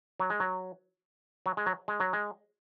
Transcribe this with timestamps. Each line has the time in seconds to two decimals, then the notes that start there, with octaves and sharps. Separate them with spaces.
0.20 F#3
0.30 G#3
0.40 F#3
1.46 F#3
1.57 G#3
1.66 F#3
1.88 G#3
2.00 F#3
2.13 G#3